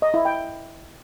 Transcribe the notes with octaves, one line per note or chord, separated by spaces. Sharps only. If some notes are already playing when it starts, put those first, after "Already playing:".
D#5
E4
G5